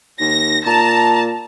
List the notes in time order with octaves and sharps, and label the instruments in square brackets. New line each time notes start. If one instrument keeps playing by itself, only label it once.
[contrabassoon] D#2 [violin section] A#6
[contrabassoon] A#2 [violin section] A5 [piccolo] A#5